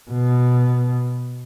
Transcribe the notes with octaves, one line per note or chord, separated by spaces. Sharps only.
B2